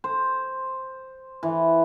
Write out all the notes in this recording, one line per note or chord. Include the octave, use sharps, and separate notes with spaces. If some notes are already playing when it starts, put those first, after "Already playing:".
C5
E3